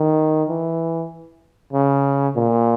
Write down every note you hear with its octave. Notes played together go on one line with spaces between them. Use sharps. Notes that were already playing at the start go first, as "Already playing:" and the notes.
Already playing: D#3
E3
C#3
A#2